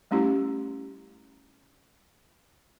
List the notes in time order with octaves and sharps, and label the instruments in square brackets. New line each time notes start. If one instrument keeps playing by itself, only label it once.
[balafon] G3 A3 C#4 E4 G4